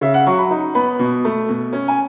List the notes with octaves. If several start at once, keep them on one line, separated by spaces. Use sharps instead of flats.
C#3 E5
F#5
F#3 C#6
B5
D#4
B3 B5
B2
A3
B2
C#4
G#5